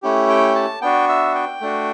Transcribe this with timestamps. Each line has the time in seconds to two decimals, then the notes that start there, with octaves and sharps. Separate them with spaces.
0.03 A3 C#4 E4 G4
0.30 G5
0.55 A5
0.82 B3 D4 F#4 G5
1.09 E5
1.35 G5
1.61 A3 D4 F#4